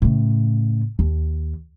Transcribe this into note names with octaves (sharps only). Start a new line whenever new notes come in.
A2 C#3
D#2